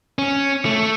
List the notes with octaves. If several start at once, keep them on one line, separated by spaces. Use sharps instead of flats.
C#4
A3